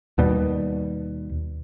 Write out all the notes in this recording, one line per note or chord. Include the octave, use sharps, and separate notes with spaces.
D#2 B2 G3